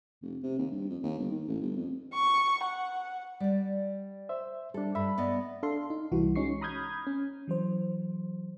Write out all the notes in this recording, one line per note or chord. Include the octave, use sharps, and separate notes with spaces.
F1
C3
D#2
G2
F2
D#2
G1
D#3
A1
G1
F2
C#6
F#5
G3 D5
C5 E5
G3 D4 A4
G2 E5 B5
B3 D5 D#5
D4 A4 F5 C6
D#4
C2 E3 G3 F#4
G#3 C#4 D#4 C#6 C7
A#5 B5 D#6 F6 G6 G#6
C#4
E3 F#3 C5